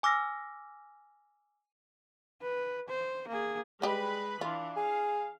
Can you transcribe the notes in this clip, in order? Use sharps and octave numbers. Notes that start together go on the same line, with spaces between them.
G#5 D6 E6 F6 A#6
B4
C5
A#3 G#4
G3 G#3 G4 B4 D#5 B5
E3 D4 F4
G#4 F5